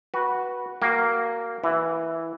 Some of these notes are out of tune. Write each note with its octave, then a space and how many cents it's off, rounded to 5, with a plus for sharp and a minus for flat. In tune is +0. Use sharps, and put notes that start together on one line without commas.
F#4 +0 B4 -15
A#3 -10 F#4 +15 G5 +0
E3 +0 E4 +0 F#5 -45